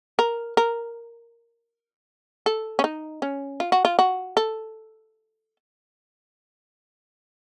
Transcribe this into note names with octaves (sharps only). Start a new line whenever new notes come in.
A#4
A#4
A4
C#4
D#4
C#4
F4
F#4
F4
F#4
A4